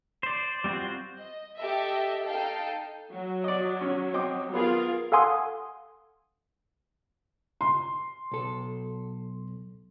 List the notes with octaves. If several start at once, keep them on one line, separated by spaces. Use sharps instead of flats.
C5 D5
G3 C4 F4 F#4 C5
D#5
G4 A4 D#5 E5
D#4 A4 F5 G5 A5
F#3
D5 D#5
C#4
C4 D#5 D6
B3 F4 G#4 A#4 F5
A4 F5 F#5 G#5 C6 D#6
C6
B1 A4